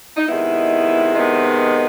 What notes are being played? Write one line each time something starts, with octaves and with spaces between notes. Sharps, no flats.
D#4
C3 D#3 G#3 B3 E4
C3 D#3 G#3 B3